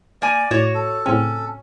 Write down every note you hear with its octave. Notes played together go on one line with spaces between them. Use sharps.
A#3 D5 G#5
A2 F#4 C#5
A4
A2 C#3 C4 C#4